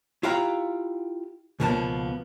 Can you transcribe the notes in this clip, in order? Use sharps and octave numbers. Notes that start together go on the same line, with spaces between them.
E4 F4 G4 F5 F#5 A#5
C#2 B2 F3 A#3 B3 A5